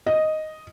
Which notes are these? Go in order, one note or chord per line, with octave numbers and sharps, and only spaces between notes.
D#5